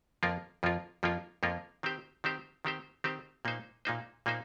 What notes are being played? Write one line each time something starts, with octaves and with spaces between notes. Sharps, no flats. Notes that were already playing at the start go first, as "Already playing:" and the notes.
F2 F3 A#3 F4 A#4
F2 F3 A#3 F4 A#4
F2 F3 A#3 F4 A#4
F2 F3 A#3 F4 A#4
D#3 C4 G4 C5
D#3 C4 G4 C5
D#3 C4 G4 C5
D#3 C4 G4 C5
A#2 A#3 D#4 C5
A#2 A#3 D#4 C5
A#2 A#3 D#4 C5